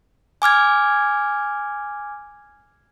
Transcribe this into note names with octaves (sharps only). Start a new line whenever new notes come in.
G#5 D6 F6 G#6